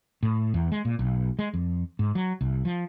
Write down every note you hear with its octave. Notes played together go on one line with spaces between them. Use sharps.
A2
E2
G#3
A#2
B1
G#3
F2
G#2
F#3
C2
F3